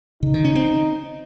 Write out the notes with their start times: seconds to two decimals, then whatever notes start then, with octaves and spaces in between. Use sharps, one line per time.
0.22 C#3 D#4
0.34 D#3
0.44 C#4
0.55 C4